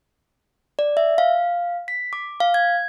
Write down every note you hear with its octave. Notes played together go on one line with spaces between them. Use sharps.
D5
E5
F5
B6
D6
F5
G#6